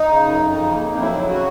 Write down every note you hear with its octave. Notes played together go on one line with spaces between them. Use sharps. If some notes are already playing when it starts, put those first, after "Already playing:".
Already playing: D#4
C#3
F#2
F2
C#3
A#3
F2
D#4
F#3 E4
C#3
F#4